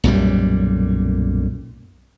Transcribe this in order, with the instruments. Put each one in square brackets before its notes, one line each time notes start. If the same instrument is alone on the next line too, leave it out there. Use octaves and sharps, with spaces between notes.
[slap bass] B1 F#2 A#2 G3